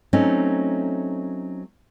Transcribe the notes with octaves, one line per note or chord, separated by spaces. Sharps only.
F#3 A3 C4 C#4 D#4